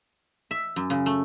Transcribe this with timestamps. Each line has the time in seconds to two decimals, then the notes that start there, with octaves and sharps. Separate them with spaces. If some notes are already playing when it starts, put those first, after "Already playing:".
0.51 E5
0.76 F#2
0.90 C#3
1.06 A3